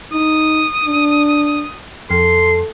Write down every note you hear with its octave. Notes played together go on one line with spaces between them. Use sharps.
D#4 D#6
D4
F2 A4 C6